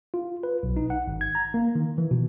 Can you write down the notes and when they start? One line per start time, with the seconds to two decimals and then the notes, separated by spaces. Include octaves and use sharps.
0.14 F4
0.43 B4
0.63 B1
0.76 D#4
0.90 F#5
1.07 G#1
1.21 G#6
1.35 A#5
1.54 A#3
1.75 D#3
1.98 E3
2.11 B2